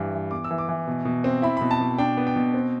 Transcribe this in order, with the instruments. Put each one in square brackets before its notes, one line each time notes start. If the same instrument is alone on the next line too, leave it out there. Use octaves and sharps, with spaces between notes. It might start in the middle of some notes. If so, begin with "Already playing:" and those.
Already playing: [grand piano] G2 E3
E3
B3 D6
E6
E3
D6
E3
B2
B2
C4
E4 B5
B2 B5
A5
B2
D4 G5
B3
G5
B2
C4